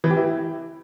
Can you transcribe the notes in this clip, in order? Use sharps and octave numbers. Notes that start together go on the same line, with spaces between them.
E3
G4
E4